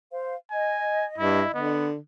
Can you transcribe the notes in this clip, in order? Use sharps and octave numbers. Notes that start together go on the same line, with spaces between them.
C5 F5
D#5 G#5
G2 E4
D3 B3